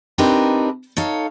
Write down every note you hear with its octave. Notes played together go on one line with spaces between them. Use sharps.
C4 D4 D#4 G4 A#4 B4
D#4 A4 C#5 F5